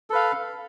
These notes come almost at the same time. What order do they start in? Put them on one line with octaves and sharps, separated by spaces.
A4 B4 F5